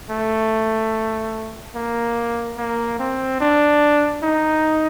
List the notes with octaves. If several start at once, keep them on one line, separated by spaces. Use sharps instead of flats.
A3
A#3
A#3
C4
D4
D#4